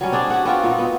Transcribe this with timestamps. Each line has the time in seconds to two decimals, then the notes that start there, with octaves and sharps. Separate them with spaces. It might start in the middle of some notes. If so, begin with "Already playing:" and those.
0.01 F#3 G3 C#4
0.12 C4 D4 G#4 D5
0.30 F#4 G4 F#5
0.45 B3 C4 F4 F#4
0.63 A#2 D#4
0.79 B3